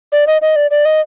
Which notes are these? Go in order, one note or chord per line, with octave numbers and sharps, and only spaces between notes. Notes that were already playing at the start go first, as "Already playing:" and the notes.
D5
D#5
D#5
D5
D5
D#5